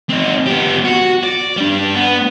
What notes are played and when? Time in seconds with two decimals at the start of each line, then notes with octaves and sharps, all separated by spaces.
0.09 C4 D#4
0.46 B3 G4
0.85 F#4
1.24 D5
1.57 G3 D4
1.95 B3